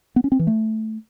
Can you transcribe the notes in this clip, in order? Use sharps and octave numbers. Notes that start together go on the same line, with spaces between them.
B3
C#4
C4
E3
A3